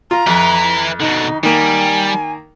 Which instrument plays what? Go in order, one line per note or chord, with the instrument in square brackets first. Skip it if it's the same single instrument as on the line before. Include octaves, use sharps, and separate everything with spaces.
[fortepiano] F4 [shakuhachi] A#5
[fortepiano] F2 [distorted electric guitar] E4 B4
[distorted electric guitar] B2 D3 [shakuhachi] D#4
[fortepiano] D#3 A#3 [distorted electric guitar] G3 [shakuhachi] G#5